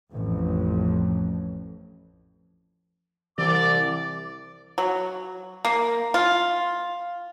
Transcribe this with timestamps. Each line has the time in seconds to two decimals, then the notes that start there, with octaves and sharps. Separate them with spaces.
0.12 A1 F2
3.38 C2 E3 D5 D6
4.78 F#3
5.65 A#3
6.14 F4